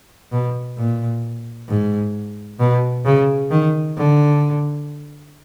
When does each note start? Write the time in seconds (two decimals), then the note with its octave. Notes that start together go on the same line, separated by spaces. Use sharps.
0.32 B2
0.78 A#2
1.68 G#2
2.60 B2
3.05 C#3
3.51 D#3
3.97 D3